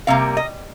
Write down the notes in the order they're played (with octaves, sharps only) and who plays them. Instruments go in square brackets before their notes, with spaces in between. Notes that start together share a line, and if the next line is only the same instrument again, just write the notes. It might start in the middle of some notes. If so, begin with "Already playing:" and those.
[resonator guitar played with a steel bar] C3 G3 A#3 F5
D#5